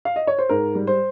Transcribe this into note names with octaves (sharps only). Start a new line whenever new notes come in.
F5
D#5
C#5
C5
G#2 A#4
G3
C5